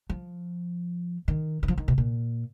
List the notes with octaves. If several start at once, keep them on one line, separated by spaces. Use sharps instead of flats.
F3
D#3
D#3
F3
D#3
B2
A#2